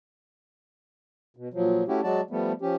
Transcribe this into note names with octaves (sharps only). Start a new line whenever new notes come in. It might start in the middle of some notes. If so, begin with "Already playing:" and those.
B2
A#2 F3 F#3
A3 C#4 E4 F#4 G4
F#3 G#3 F#4 D5 A5
F3 G3 A3 B3
F3 C#4 G4